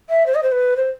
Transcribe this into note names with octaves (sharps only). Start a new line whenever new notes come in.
E5
C5
D#5
C5
B4
C5